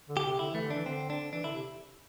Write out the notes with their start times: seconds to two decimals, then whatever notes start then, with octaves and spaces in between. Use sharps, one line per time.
0.09 D3
0.17 G4
0.24 C3
0.39 D3 E4
0.51 E3 A3
0.62 D3
0.70 E3 D4
0.86 D3 C4
1.10 D4
1.33 E3 D4
1.43 D3 E4
1.53 C3